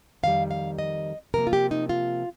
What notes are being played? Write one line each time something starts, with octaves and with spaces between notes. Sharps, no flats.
F2 D#3 G3 F5
F5
D#5
C3 F3 A#3 A#4
F4
G4
D#4
F4